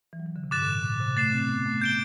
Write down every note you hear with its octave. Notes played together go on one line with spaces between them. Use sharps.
E3
F#3
E3
D3
C3
G2 D6 F#6 A6 E7
A2
B2
A2
B2
C3
A3 A6 C7 E7
C4
B3
A3
G6 D7 G7